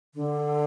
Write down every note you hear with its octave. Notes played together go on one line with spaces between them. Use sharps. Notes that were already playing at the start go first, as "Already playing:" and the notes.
D3